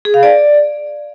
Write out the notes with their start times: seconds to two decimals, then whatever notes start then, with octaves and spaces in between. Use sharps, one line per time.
0.05 G#4
0.14 F5
0.23 D5